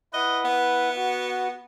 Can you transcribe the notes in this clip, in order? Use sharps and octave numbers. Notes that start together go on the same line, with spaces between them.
E4 B4 D#5 F#5
B3
F#4